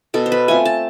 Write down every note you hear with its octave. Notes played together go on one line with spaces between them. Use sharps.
B2 A4
C5
B4
A3 C4 F4 G#5
A5